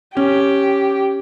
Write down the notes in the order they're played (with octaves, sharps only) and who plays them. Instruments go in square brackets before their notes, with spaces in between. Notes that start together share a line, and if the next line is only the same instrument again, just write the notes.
[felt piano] C#4 [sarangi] G4